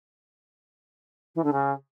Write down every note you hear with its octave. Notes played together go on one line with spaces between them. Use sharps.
E3
D3
C#3